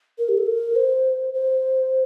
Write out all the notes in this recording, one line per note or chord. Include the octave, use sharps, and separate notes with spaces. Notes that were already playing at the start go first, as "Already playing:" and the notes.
A#4
G4
A4
A#4
C5
C5